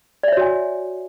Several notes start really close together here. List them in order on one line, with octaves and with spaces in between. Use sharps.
D5 E5 C#5 F#4 G#5